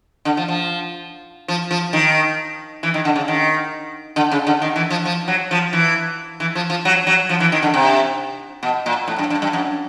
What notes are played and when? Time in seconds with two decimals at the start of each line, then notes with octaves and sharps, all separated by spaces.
0.25 D3
0.37 F3
0.48 F3
1.48 F3
1.71 F3
1.93 D#3
2.83 E3
2.94 D#3
3.05 D3
3.16 C#3
3.28 D#3
4.16 D3
4.31 C#3
4.47 D3
4.62 D#3
4.76 E3
4.90 F3
5.05 F3
5.28 F#3
5.51 F3
5.73 E3
6.40 E3
6.55 F3
6.70 F3
6.85 F#3
7.07 F#3
7.29 F3
7.40 E3
7.52 D#3
7.62 D3
7.74 C3
8.63 B2
8.86 A#2
9.07 A2
9.18 G2
9.30 G2
9.42 G2
9.53 F#2